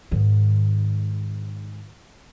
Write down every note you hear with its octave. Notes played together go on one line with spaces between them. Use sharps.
G#2 D#3